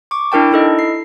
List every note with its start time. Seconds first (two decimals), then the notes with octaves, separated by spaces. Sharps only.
0.11 C#6 D6
0.32 D4 E4 A#4 G5 A5
0.51 D#4 E4 A4 D#5
0.79 C7